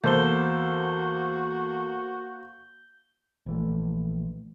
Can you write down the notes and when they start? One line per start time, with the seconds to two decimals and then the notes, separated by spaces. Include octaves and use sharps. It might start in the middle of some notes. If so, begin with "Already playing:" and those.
0.04 E2 A#3 F#4 A4 C5 G6 G7
3.46 A#1 E3 A3